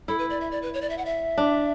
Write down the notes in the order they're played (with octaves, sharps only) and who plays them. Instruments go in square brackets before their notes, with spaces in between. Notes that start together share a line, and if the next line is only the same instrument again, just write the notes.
[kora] E4 [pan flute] A4
[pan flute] B4
D5
E5
D5
B4
C#5
D5
E5
F#5
E5
[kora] D4